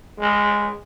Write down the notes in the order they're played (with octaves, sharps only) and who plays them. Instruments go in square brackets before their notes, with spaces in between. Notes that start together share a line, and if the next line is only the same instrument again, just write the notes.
[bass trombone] G#3